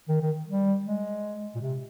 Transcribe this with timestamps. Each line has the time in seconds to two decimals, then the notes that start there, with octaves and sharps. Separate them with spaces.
0.09 D#3
0.21 D#3
0.47 G3
0.85 G#3
1.55 A#2
1.61 C3